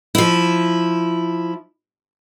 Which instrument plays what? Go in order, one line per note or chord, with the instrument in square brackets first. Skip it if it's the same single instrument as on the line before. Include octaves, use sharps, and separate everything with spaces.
[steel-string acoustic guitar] F3 E4